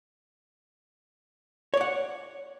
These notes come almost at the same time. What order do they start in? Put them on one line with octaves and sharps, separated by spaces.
C#5 D5 F#5